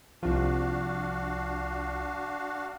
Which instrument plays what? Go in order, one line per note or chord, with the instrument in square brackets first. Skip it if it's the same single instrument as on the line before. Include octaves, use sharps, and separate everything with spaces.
[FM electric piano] C2 F3 [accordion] D4 F#4 F5